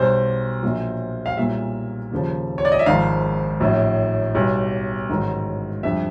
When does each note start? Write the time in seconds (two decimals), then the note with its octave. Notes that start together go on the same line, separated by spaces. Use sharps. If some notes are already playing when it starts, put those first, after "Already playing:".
Already playing: B1 B2 G3 C5
0.63 A#1 A#2 F#3
1.26 F5
1.37 B1 A#2 G3 E5
2.12 D#2 C#3 F3
2.58 C#5
2.65 D5
2.72 D#5
2.79 E5
2.86 G#1 G#2 F3 F5
3.60 A#1 A2 F#3
4.35 B1 B2 G3
5.09 A1 G#2 D#3 F#3
5.83 F2 D3 G3 E5